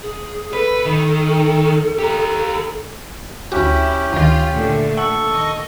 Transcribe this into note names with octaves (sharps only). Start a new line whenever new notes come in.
G#4
A4 B4
D#3
G4 A#4
D2 C#4 E4 F#4 G4
D2 D#3 F4
A#2 D3 A3
A4 F#5 C#6
D#3 D#5